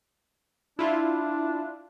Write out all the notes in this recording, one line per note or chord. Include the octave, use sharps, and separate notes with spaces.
D4 E4 F4